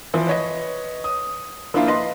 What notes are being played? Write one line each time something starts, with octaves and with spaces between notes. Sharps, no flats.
E3 F3
B4 C#5 D#5
D#6
F3 A#3 D4 E4 F4
B4 D#5 C6